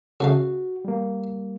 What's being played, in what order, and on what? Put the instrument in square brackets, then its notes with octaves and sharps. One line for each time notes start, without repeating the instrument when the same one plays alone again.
[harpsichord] C#3 A3 F5 [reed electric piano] F#4
[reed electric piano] G3 A#3